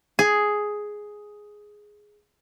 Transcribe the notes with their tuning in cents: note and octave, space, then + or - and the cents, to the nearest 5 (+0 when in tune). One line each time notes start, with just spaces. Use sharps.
G#4 +5